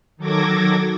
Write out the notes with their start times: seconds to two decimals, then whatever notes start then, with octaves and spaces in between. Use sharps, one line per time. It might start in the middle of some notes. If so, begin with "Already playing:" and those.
0.17 D#3 F#3 A4 D6 G#6 A#6